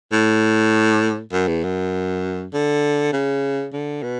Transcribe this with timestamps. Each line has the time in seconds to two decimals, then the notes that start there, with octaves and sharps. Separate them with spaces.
0.12 A2
1.32 F#2
1.48 E2
1.64 F#2
2.54 D3
3.13 C#3
3.73 D3
4.03 B2